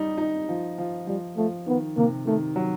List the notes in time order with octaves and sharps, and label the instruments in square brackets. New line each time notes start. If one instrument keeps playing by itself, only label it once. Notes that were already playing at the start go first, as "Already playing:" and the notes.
Already playing: [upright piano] G3 D#4
D#4
F3
F3
[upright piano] F3 [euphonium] G3
[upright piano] F3 [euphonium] A3
[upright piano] D#3 [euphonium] B3
[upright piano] C3 [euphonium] A#3
[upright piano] D#3 [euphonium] A3
[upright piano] F#3